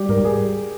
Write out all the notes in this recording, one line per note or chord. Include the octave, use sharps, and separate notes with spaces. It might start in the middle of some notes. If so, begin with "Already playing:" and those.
Already playing: G3 G4
G#2 A#4
G#4